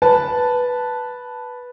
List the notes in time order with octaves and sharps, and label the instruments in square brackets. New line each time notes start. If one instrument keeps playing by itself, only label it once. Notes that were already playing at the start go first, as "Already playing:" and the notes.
[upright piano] B4 A5